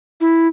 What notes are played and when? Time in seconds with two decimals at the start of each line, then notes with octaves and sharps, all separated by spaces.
0.21 E4